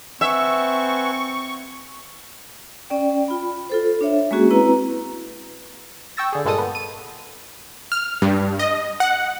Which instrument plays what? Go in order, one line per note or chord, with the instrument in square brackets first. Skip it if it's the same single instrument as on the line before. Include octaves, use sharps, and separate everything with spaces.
[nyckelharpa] C4 [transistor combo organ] B4 F#5 G#5 [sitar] E5 [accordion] C#6
[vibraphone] C#4 D5 G5
F4 B5
F4 A4 C5
D4 C#5 E5
G#3 A#3 C#4 F#4 G#4
C4 E4 B4 A#5
[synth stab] G5 C#6 E6 A6 A#6
D3 G#4
G2 A#2 G#3 A4 A5 D#6
B3
D#7
[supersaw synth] F6
G2
D#5
F#5